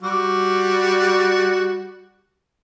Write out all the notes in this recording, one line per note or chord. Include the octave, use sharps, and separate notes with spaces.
G3 F#4